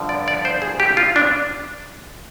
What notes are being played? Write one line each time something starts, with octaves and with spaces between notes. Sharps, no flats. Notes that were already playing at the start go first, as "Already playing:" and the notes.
Already playing: G2 D3 F3
D5
D5
C5
G#4
G4
F4
D4